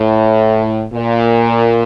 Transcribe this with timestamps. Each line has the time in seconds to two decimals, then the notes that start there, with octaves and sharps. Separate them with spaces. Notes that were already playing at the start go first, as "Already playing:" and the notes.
Already playing: A2
0.93 A#2